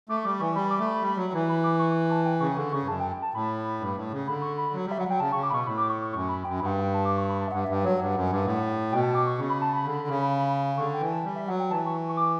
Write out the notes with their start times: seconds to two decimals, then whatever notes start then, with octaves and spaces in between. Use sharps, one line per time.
0.09 A3 D6
0.17 C#6
0.25 G3 D6
0.40 E3 C#6
0.55 G3 B5
0.71 D6
0.79 A3
0.87 B5
1.02 G3
1.17 F#3
1.33 E3
1.49 B5
1.64 D6
1.79 C#6
2.11 A5
2.25 G5
2.41 C#3 C#6
2.56 D3 C#6
2.72 C#3 C#6
2.83 G2
2.87 F#2 A5
3.00 G5
3.11 G5
3.22 A5
3.34 A2 B5
3.80 G2
3.96 A2
4.11 C#3
4.28 D3 B5
4.42 C#6
4.58 B5
4.73 F#3
4.85 G3
4.91 E5
4.97 F#3
5.01 F#5
5.08 F#3 G5
5.20 C#3 A5
5.32 C#6
5.36 C#3
5.43 D6
5.50 B2 B5 C#6
5.66 A2 B5
5.78 D6
5.89 C#6
6.01 C#6
6.13 F#2 C#6
6.29 B5
6.44 F#2 G5
6.59 G2 B5
6.66 F#5
6.71 G5
6.82 G5
6.94 A5
7.05 D6
7.17 C#6
7.29 B5
7.41 A5
7.48 E5
7.52 G2 F#5
7.64 E5
7.68 G2
7.75 G5
7.84 F#3 F#5
7.99 G2
8.15 F#2
8.30 G2
8.45 A2
8.92 B2 G5
9.03 A5
9.15 D6
9.27 C#6
9.38 C#3 C#6
9.49 B5
9.62 A5
9.73 B5
9.85 D3
10.08 C#3
10.77 D3 C#6
10.94 G5
11.01 E3
11.08 A5
11.24 G3
11.36 E5
11.47 F#3 F#5
11.60 G5
11.70 E3 A5
11.86 C#6
12.09 C#6
12.17 D6